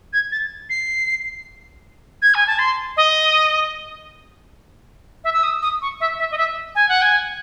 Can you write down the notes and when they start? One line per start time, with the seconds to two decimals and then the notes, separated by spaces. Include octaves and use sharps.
0.13 G#6
0.32 A6
0.70 C7
2.22 G#6
2.35 G#5
2.47 A5
2.59 C6
2.97 D#5
5.24 E5
5.34 E6
5.43 D#6
5.62 D#6
5.82 C#6
6.01 E5
6.19 E5
6.31 D#5
6.38 E5
6.75 G#5
6.89 F#5
7.02 G#5